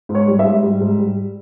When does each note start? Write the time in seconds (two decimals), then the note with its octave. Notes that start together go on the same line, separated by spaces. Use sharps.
0.09 G#2
0.15 C#5
0.28 G3
0.39 E5
0.45 G#2
0.63 G3
0.81 G#2
0.99 G3